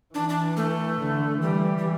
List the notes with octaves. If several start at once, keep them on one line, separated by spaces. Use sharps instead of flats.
E3 D4
D4
A3
D3
E3 G3
G3